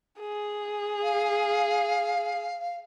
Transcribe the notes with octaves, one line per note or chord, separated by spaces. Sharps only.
G#4
F5